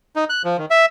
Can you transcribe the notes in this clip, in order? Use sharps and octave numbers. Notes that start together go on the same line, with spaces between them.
D#4
F#6
F3
D#3
E5